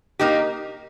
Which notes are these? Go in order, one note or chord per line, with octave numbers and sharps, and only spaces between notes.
A#3 D#4 G4